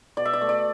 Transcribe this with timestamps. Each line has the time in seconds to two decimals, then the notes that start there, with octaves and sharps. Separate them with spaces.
0.17 B2 D5
0.26 E5
0.33 D5
0.41 A3
0.49 D5